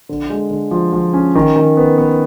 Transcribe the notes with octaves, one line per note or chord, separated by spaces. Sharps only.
D3
G#3
D3
F3
F3
C#4
D#3
D#3
B3
B3